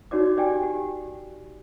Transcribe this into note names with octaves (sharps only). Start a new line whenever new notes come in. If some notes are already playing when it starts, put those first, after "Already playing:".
D#4 F#4 C#5 D5 D6
G4 D5 G5 G#5
G4